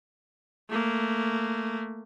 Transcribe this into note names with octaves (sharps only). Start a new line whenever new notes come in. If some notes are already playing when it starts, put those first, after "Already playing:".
A3 A#3